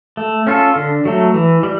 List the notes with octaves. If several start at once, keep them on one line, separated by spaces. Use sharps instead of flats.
A3
C#4 F4 A4
D3
F#3 A3
E3
G3